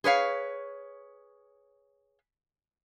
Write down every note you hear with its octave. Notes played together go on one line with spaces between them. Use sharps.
G#4 B4 C#5 F5